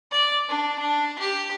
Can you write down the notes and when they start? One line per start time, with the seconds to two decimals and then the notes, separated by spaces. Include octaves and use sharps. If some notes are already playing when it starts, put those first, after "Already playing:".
0.11 D5
0.49 D4
0.79 D4
1.19 G4